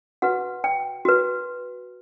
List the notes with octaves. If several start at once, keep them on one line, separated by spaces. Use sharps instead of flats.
F#4 B4 F#5
G5
F#4 B4